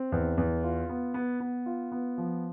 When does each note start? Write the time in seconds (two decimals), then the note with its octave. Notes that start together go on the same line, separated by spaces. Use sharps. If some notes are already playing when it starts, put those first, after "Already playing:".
Already playing: C4
0.12 E2
0.38 E2
0.64 F4
0.89 B3
1.14 B3
1.40 B3
1.66 F4
1.92 B3
2.18 F3